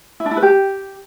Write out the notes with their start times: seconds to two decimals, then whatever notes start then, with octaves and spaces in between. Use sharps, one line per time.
0.20 E4
0.26 D4
0.31 E4
0.37 B4
0.43 G4